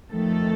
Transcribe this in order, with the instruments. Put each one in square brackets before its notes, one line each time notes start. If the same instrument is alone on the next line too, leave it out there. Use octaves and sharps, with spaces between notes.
[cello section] F2 D#3 A3 A4